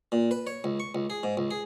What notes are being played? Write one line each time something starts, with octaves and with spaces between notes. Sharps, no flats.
A#2
B4
C#5
C#2
C#6
C#2
G#4
G#2
C#2
G#4